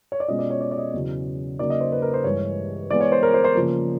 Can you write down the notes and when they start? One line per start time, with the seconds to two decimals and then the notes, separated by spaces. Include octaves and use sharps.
0.12 C#5
0.20 D5
0.28 B2 G#3 C#4 F4 D#5
0.39 D5
0.50 C#5
0.61 D5
0.71 D5
0.78 D#5
0.94 E2 C#3 F#3
1.59 C#3 F#3 A#3 D#4 D5
1.70 D#5
1.81 C5
1.92 B4
2.02 A#4
2.14 C5
2.24 G2 E3 G#3 C#5
2.91 E3 G#3 B3 D5
3.01 C#5
3.12 C5
3.23 A#4
3.34 C5
3.44 C5
3.55 C#3 F3 A#3